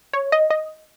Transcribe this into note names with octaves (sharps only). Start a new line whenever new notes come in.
C#5
D#5
D#5